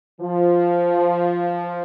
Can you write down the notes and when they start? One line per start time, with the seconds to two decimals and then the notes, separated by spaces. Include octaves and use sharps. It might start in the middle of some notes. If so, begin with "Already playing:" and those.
0.20 F3